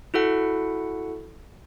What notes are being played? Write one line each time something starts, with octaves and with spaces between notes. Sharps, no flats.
E4 F#4 A4 F#5